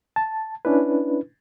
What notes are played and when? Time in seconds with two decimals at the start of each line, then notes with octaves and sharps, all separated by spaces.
0.16 A5
0.65 C#4 D4 E4 B4